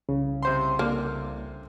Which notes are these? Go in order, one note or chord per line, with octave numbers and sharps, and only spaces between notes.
C2 C#3
C3 C5 C6
D3 A#3